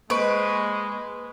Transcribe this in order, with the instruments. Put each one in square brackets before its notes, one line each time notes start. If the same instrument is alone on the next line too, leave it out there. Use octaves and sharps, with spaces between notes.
[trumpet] G#3 [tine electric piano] A#3 D#5 [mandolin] B4 [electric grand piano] C5 C#6 D7